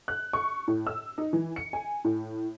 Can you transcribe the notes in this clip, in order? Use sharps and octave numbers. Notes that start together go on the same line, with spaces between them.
F#6
C#6
A2
E6
D#4
E3
C#7
G#5
A2